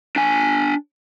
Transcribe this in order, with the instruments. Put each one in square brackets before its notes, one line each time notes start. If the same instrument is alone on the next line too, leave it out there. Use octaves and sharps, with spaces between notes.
[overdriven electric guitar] D4 G#5